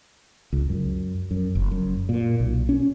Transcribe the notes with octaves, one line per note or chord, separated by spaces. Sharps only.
C#2
F#2
F#2
F#1
F#2
A#2
B1
C#4